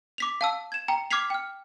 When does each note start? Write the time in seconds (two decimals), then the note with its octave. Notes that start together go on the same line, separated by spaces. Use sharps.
0.18 D6 B6 F7
0.41 F5 A5 E6
0.72 G#6 E7
0.88 G5 A#5
1.11 D6 F6 G#6 B6 C7 F7
1.30 G5 F6